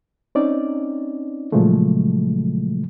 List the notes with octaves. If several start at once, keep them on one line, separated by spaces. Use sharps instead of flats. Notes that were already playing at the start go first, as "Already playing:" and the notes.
C4 C#4 D#4 D5
A#2 C#3 F3 F#3 G#3 A3